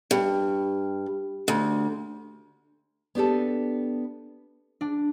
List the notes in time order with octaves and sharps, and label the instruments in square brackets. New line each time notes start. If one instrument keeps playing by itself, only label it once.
[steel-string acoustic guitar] G2
D2
[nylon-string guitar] B3 D4 G4 A4
[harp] D4